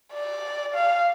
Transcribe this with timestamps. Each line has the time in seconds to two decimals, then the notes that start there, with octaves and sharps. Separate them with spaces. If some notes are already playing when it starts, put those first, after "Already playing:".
0.14 D5
0.74 F5